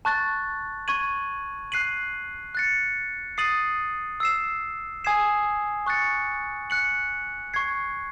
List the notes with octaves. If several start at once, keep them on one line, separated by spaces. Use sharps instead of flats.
A5 C#6 F#6 A6
C#6 G#6 D#7 F#7
F#6 C7 D#7 F#7
F#6 A6 C#7
D#6 A6 C7 D#7 F#7
E6 C7 E7
G#5 D#6 G#6 C7 E7
C#6 F#6 A6 C#7
F#6 C#7 F#7
C#6 G#6 C7